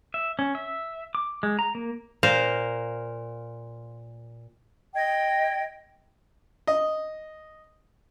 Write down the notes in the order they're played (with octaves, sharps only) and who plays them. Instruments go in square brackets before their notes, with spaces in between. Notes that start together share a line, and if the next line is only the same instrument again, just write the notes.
[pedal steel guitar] E5
C#4
E5
D6
G#3
A#5
A#3
[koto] A#2 A#4 C5 F5
[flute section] D#5 G5 G#6
[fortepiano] D#5